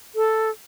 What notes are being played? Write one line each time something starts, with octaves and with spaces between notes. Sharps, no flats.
A4